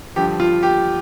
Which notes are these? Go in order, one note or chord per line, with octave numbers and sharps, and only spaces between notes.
G2 D3 F3 G4
F4
G4